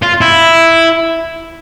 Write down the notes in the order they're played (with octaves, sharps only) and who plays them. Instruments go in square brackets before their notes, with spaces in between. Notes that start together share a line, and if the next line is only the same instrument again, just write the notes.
[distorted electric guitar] F4
E4